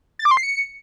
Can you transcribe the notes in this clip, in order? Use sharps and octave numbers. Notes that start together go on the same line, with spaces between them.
A6
D6
C6
C7
C#7